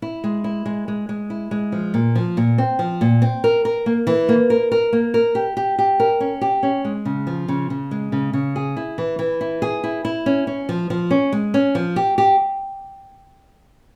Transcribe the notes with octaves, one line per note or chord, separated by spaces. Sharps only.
E4
G#3
E4
G#3
G#3
G#3
E4
G#3
F3
A#2
F3
A#2
C4
F3
A#2
C4
A#4
A#4
A#3
E3
A#3
A#4
A#4
A#3
A#4
G4
G4
G4
A#4
C#4
G4
C#4
G#3
C#3
F3
C#3
C#3
G#3
C#3
C#3
G#4
E4
E3
E3
E4
G#4
E4
E4
C#4
C#4
F3
F3
C#4
G#3
C#4
F3
G4
G4